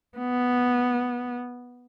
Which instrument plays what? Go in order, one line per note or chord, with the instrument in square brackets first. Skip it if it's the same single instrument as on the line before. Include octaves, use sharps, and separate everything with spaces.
[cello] B3